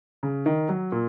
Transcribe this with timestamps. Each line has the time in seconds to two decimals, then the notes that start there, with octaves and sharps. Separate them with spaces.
0.23 C#3
0.46 D#3
0.69 F#3
0.92 A#2